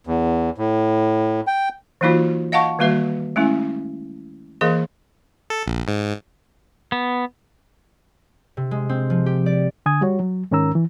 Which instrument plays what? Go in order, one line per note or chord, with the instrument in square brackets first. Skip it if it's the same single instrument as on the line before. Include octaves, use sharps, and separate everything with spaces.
[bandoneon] E2
A2
G5
[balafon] E3 F#3 A#3 D#4 F4 F#4
D#5 F5 F#5 A5 C#6
D#3 G3 A#3 F#4 B4 E5
G#3 A3 C#4 E4
E3 A#3 G#4 A#4 D#5 C6
[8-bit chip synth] A4
A#1
G#2
[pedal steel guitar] B3
[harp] C3
G#3
C4
F3
G4
D5
[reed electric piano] D3 G#5 D#6 G#6
G3 F#4 C#5
F#3
G#2 D#3 C#4 A#4 A#5 E6
E3